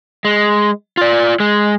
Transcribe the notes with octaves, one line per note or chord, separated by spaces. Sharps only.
G#3
F4 D5
G#3